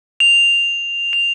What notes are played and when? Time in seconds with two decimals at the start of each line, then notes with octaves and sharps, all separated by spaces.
0.20 F7
1.13 F7